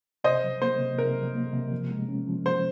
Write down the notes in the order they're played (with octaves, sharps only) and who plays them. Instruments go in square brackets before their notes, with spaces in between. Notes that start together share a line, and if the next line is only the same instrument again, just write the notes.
[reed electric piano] C3 [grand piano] C5 D#5
[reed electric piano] F#3
[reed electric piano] A#3 [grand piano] C5
[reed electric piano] C3
[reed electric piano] C3 [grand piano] A#4
[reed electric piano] F#3
A#3
C3
F3
G#3
C#4
F3
[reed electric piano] F3 [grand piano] C5